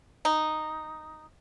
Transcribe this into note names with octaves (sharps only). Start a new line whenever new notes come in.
D#4